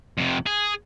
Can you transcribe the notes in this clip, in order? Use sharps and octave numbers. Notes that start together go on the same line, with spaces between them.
F2 C3
G#4